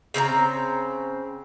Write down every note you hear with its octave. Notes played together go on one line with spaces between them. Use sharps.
C#3 C4 A#4 A#5